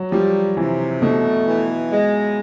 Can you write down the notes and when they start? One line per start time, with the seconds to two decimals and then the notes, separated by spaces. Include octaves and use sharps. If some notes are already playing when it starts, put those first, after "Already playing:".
Already playing: F#3
0.12 F3 G3
0.57 C3 E3
1.02 B2 A3
1.47 E3
1.91 G#3